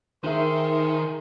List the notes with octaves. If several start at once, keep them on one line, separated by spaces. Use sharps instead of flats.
D#3 D#4 G#4 A#4 C5 E5 C6